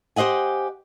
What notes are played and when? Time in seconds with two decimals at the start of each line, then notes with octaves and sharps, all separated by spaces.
0.16 G4 C5 D#5 F#5 G#5